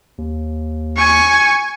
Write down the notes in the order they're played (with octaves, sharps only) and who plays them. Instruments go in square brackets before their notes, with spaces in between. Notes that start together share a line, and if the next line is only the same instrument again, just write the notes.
[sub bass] D#2
[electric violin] G#5 C#6